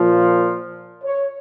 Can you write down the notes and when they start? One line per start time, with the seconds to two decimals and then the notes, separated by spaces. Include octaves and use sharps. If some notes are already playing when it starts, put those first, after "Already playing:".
Already playing: A#2 F3
1.04 C#5